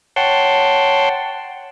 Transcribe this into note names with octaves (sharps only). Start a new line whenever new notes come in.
C#5 F#5 G5 A5 C6